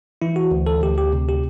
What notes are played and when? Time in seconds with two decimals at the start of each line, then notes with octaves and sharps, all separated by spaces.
0.22 E3 E4
0.36 F#4
0.51 D2
0.67 A4
0.82 D2 G4
0.98 G4
1.13 C3
1.29 G4